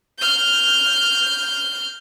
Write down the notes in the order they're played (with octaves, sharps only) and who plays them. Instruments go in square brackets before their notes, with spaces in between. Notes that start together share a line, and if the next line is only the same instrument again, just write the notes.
[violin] F6 G6